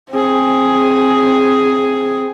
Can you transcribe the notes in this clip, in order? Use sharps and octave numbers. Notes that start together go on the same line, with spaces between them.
C4 G#4